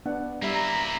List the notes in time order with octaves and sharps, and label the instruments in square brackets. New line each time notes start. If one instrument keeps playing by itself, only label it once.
[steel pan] B3 D4 F#5
[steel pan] G3 E5 [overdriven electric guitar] A#3 E4
[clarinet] A#5